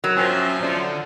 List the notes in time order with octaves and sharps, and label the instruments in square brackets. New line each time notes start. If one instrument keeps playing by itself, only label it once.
[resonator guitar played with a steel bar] F#3 [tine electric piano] A#4
[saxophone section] F3 [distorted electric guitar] C#4 E5 [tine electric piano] G5 G#5 E6
[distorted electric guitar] D3 A4 [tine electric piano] D5